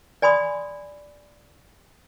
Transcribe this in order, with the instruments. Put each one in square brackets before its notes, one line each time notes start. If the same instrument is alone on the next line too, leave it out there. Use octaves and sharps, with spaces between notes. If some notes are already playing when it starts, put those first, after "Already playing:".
[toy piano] D5 G#5 B5 C6 D#6